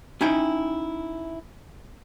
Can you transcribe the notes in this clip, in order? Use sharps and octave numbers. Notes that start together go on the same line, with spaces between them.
C#4 D#4 E4 G5